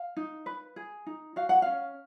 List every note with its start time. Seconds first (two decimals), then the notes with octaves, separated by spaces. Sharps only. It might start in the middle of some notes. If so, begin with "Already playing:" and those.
Already playing: F5
0.17 D#4
0.46 B4
0.76 G#4
1.06 D#4
1.36 F#4 F5
1.49 F#5
1.62 C#4 F5